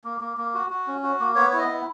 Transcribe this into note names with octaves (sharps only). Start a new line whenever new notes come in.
A#3
A#3
A#3
F#4
F#4
C#4
F#4
A#3
B3 C#5
E4 C#5
D#5
B3